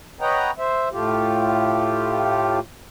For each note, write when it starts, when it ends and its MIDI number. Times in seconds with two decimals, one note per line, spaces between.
0.21 0.51 71
0.21 0.51 73
0.21 0.51 75
0.21 0.51 78
0.21 0.51 79
0.21 0.51 82
0.58 0.89 72
0.58 0.89 76
0.92 2.59 45
0.92 2.59 57
0.92 2.59 65
0.92 2.59 67